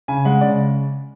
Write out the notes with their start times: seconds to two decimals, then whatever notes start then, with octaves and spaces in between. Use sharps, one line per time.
0.08 C#3 G#5
0.25 G#3 F#5
0.41 C#3 D5